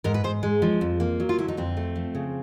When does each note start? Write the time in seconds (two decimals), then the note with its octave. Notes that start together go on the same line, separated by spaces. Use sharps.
0.04 G#2 A#4
0.14 B4
0.24 G#2 C5
0.43 G#3
0.62 F3
0.81 F2
1.00 A#3
1.20 F#3
1.29 F4
1.39 D3 E4
1.48 D#4
1.57 F2 C4
1.77 A3
1.96 F3
2.15 C#3